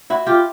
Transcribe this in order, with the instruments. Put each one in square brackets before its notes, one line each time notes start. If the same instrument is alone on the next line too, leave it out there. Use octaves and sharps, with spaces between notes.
[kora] E4 F#4
F4 G4